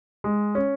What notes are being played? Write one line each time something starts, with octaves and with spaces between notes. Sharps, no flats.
G#3
C#4